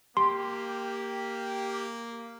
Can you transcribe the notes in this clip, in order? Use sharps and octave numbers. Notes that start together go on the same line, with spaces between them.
A#3 G4 C6